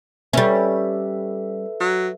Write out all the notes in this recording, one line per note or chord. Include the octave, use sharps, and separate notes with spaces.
G3 C#4 A4 B4 E5
F#3